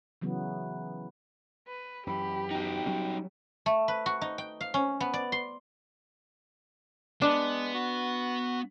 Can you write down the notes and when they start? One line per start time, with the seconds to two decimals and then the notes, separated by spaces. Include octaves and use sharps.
0.22 C#3 E3 F#3 B3
1.68 B4
2.07 F#2 E3 G4 B5
2.51 D#4 F#4 G5
2.86 F#3 G3 C#4
3.66 A3
3.88 B4
4.06 F#4
4.21 D#4
4.38 G5
4.61 F5
4.74 C#4
5.00 B3
5.13 D5
5.32 C6
7.22 G#3 B3 D4
7.74 F#4